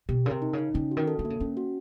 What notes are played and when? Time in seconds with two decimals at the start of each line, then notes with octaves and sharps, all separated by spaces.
0.09 B2 G4
0.26 C#3 A#4
0.31 C3
0.42 D#4
0.53 C#3
0.58 D#4
0.74 C#3 C#4
0.91 F#4
0.97 D#3
1.08 A4
1.19 D3
1.25 A#3
1.30 C#3
1.40 D3 C#4
1.57 F#4